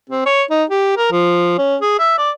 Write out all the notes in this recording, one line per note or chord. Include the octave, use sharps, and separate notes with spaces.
C4
C#5
D#4
G4
A#4
F3
C#4
G#4
E5
D5